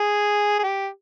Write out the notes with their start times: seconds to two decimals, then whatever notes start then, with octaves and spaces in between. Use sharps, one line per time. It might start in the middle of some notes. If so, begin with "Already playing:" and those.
Already playing: G#4
0.59 G#4
0.63 G4